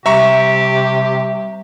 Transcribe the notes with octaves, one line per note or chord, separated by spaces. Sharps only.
C3 G3 G4 E5 A#5 C#6